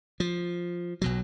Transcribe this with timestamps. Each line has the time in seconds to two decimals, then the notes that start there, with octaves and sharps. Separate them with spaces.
0.20 F3
1.02 B1 B2 F#3